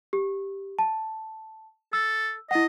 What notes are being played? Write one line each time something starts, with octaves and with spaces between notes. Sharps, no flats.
G4
A5
A4 E6
E4 D#5 F#5